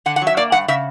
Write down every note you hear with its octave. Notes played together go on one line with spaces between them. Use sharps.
D3 F#5
F#5
F#3
E5
A#3 D5
G2 F#5
C#3 E5